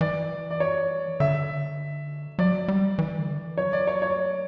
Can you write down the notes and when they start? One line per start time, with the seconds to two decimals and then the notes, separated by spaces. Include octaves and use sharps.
0.01 E3 D5
0.51 D5
0.60 C#5
1.20 D3 E5
2.39 F#3 D5
2.68 G3
2.99 E3
3.18 D3
3.38 E3
3.58 F#3 C#5
3.73 D5
3.87 C#5
4.02 C#5